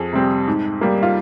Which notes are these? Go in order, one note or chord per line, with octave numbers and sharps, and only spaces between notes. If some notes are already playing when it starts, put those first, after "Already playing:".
Already playing: F2 G#4
C3 G3 C4
G#2
G3 A#3
F4